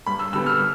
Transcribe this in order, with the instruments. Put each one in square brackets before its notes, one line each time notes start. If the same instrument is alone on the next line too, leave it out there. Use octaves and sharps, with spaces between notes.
[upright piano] G2 B5
E6
D3 G3 B3 E6
F6